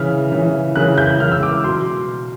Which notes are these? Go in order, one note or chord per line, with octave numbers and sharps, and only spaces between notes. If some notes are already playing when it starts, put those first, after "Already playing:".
Already playing: C#3 E3 F6
C#3 E3
C#3 E3 F#6
G6
C#3 E3 F6
E6
D6
B2 F#3 C6